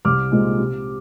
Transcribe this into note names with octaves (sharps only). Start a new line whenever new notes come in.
C2 D6 F6
A#2 G#3 C4 D#4
C3